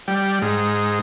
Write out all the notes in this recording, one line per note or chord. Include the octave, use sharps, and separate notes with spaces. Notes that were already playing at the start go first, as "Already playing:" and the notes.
G3
G#2